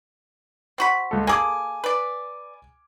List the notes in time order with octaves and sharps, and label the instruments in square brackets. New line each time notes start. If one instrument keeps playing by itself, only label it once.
[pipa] C4 F#4 B5
[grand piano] C#2 A4
[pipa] A#3 G#4 A4 [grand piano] G#5 D6
[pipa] B4 D5